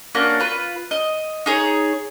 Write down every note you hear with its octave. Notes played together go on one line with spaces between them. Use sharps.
A#3 C#4 D4 F#4
F4 B4
D#5
D#4 G#4 C#5